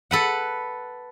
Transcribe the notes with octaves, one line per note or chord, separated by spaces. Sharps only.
A4 B4 F#5